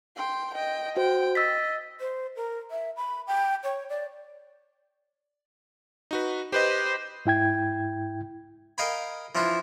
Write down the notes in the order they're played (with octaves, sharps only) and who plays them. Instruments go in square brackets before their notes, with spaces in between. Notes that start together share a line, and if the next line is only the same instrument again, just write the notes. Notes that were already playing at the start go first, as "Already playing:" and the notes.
[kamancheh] G5 C6
D#5 G5
[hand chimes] F#4 C5 [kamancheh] G5
[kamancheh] D#5 [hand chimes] E6 A6 B6
[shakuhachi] C5
A#4
E5
B5
G5
C#5
D5
[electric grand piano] D#4 F#4 B4
[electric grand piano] G4 B4 D#5 [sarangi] C5
[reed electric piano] G#2 E4 G5 G#6
[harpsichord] A#4 D#5 F5 G5 G#5 B5
E3 F3 D4 E4 F4